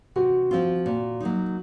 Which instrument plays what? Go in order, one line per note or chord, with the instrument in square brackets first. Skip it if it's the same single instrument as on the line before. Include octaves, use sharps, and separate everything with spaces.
[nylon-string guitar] C3 [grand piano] F#4
[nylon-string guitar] F3 C4 F4
A#2
F#3 A#3 D#4